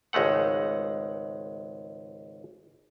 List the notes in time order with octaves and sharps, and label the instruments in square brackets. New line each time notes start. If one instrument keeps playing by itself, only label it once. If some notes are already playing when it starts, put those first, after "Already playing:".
[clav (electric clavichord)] G#1 C#2 G#3 A3 F#5